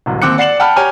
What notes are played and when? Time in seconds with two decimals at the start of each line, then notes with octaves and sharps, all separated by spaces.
0.06 D1 C2
0.22 D#2 C4 D6 F#6 C#7
0.38 D5 F#5 C7 C#7 E7 F#7
0.60 F#5 G5 A5 B5 F6
0.76 G4 C#5 G#5 A#5 F6